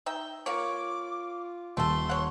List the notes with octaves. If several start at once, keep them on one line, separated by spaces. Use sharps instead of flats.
D#4 E5 G5
A#3 F4 C#5 D6
D#1 A3 A4 C6
C#5 F#5